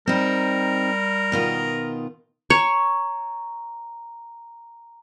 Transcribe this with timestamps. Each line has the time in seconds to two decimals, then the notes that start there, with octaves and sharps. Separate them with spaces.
0.07 G3 C4 D#4 A#4
1.32 B2 D#3 F4
2.50 C#5 A#5